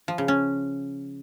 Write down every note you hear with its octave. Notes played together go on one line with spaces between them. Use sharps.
F3
C#3
C#4